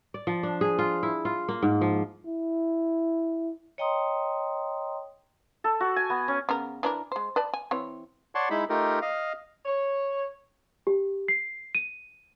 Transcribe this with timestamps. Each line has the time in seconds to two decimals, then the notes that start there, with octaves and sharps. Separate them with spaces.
0.14 D5
0.27 F3
0.43 D4
0.61 G#4
0.79 F4
1.03 E4
1.25 F4
1.48 A#3
1.62 G#2
1.81 F3
2.26 E4
3.78 C#5 D#5 G5 A#5 C6 D#6
5.64 A4
5.80 F#4
5.96 G#5
6.10 B3
6.28 C#4
6.49 C#3 B3 A#4
6.83 E3 D4 A#4
7.12 G#3 C5
7.36 B4 D5 A5
7.54 G#5
7.71 E3 C4 C#5
8.35 C#5 D5 F#5 A5 C6 C#6
8.50 G#3 D#4 E4 B5
8.69 A3 D#4 F4 G4 A#4
9.02 D#5 F5
9.65 C#5
10.87 G4
11.28 C7
11.75 D#7